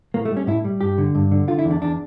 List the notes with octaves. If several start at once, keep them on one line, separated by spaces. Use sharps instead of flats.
A2 A#3
A3
G3
C#4
A2 E4
G3
G2 G4
D3
G2
D3
D3 F4
E4
E2
D4
E2 D4